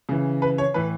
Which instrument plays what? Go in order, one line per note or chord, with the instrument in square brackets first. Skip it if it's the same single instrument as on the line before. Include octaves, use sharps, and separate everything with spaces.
[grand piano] C#3 E3
B4
C#5
A2 E3 B4